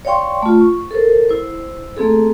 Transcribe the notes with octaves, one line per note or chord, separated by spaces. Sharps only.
C#5 D5 F5 G5 C6 C#6
A3 F4
C#6
A4 A#4 C5
E4 C5
A3 A#3 C4 G#4 A4